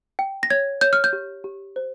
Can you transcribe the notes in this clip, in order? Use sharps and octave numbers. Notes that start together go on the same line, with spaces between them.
G5
A#6
C#5 G#6
C#5 G6
F6
G6
G4
G4
C5